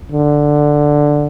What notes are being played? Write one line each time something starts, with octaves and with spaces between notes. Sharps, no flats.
D3